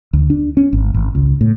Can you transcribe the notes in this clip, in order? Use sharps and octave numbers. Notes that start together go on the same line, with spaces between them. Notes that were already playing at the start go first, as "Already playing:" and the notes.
D2
D4
C#4
G#1
G#1
C#2
A2